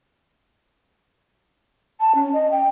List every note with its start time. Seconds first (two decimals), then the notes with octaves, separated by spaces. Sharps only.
2.00 A5
2.15 C#4
2.33 D#5
2.51 G5